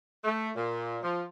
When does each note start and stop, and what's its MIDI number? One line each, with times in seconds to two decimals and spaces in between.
0.24 0.49 57
0.56 0.97 46
1.02 1.23 53